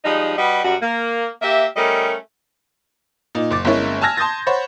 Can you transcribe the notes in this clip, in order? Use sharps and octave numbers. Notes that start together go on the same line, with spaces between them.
F3 G3 G#3 D#4
G3 F#4 B4 D#5
F#2 G3 F#4
A#3
A#3 G4 E5
G3 A3 C#4 A#4 D#5
A#2 D#4
F#1 D6 A6
G1 G#3 A#3 C#4 E4 C#5
G#5 A5 E6 F6 G#6 A#6
A5 C6 D#6 G6 A6 A#6
C5 C#5 F#5 B5